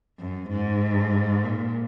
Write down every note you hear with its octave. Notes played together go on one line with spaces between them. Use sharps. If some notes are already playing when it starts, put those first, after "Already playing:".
F#2
G#2
A#2